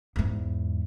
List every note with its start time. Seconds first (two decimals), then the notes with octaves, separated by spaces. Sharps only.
0.16 E2 G#2